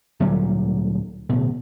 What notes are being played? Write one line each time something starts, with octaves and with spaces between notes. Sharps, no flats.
D2 A#2 F#3 G3
D1 B2